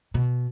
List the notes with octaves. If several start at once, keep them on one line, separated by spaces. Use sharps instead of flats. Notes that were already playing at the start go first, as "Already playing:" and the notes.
B2